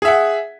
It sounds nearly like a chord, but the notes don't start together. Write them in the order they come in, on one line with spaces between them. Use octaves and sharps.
G#4 E5 F#5